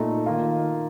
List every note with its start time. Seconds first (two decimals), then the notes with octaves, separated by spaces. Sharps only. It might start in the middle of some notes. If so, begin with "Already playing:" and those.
Already playing: A#2 A3 D#4 A4
0.26 D#3 A#3 F4